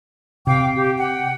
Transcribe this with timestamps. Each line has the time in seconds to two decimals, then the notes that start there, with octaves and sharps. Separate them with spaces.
0.47 C3 F5 G5 D6
0.76 G4
0.97 F#5 G5